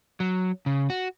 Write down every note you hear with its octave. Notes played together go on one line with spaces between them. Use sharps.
F#3
C#3
F#4